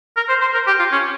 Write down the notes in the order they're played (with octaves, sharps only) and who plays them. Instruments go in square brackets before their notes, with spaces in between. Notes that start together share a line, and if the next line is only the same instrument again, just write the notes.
[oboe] A#4
C5
C5
A#4
G4
F4
C#4